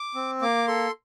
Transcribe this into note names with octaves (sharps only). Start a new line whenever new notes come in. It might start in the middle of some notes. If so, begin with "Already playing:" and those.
Already playing: D6
C4
A#3 D6
A4 C6